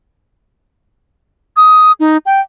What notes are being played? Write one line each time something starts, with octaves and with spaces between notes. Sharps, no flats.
D#6
D#4
G5